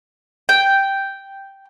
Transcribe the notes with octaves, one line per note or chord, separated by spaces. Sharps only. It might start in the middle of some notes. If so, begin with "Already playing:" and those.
G5